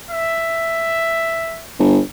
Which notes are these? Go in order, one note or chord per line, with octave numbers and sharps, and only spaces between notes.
E5
G1